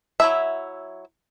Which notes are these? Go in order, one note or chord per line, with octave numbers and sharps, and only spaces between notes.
F#3 E4 E5